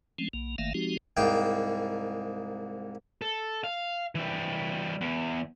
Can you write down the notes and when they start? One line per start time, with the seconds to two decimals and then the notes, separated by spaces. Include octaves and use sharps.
0.18 F3 G#3 A3 C4 C#4
0.33 B1 A#3
0.58 G1 D#3 A3 A#3 E5 F5
0.74 F3 G#3 C4 D#4 F#4 G4
1.17 C2 G#2 A#3 G5
3.22 A4
3.64 F5
4.15 E3 G3
5.01 E2